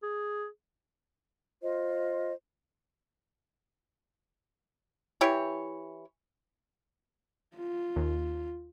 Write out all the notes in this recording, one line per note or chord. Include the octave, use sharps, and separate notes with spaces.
G#4
F4 C5 D#5
E3 E4 G4 C#5
F4
D#2